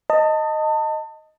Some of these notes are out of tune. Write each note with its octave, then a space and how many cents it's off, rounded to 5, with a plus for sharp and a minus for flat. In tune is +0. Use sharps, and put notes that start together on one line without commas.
D#5 +0 A5 +30